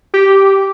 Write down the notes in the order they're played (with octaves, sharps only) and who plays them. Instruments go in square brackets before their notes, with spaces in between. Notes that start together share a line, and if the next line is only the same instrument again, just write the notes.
[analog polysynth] G4